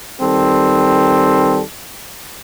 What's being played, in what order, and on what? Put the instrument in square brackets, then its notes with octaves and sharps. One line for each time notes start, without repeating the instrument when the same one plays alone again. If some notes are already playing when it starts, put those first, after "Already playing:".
[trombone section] D#3 G3 C4 A4